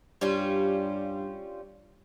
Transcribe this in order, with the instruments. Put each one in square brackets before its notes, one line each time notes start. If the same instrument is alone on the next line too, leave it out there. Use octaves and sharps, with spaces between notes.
[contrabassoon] G2 [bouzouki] G3 C#4 F4